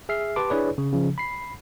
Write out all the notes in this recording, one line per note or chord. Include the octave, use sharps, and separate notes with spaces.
G#4 E5 F6 C7
G4 B4 A5 C6 D6
D4 E4 G#4 B4 C#5 D5
C#3
C#3 F3
B5 C7